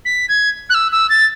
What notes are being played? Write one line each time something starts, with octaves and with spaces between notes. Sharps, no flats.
B6
G#6
F#6
E6
E6
A6